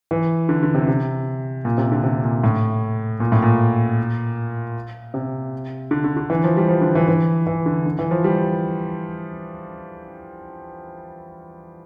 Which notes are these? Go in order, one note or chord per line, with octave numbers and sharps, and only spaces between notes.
E3
D3
D3
C3
C3
A#2
C3
D3
C3
A#2
A2
A#2
A2
A#2
C3
D3
D3
D3
E3
F3
G3
F3
D3
E3
E3
E3
D3
D3
E3
F3
G3